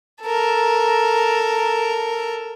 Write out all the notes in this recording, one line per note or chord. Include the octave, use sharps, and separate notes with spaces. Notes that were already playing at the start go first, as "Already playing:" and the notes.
A4 A#4